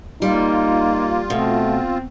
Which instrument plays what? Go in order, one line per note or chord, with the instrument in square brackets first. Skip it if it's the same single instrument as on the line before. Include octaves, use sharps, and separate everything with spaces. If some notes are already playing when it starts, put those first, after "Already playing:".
[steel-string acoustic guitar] G3 [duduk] A#3 [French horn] D#4 [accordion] F4
[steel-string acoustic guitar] B2 [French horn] A3 [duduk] C4